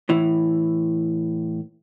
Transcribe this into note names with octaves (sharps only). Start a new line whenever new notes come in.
A2 E3